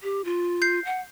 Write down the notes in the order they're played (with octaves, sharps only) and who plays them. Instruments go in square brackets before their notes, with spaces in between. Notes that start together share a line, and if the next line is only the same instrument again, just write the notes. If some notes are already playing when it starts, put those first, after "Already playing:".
[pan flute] G4
F4
[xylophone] G6 C7
[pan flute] F#5